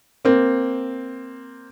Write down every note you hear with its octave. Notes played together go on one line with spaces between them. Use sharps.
A#3 C4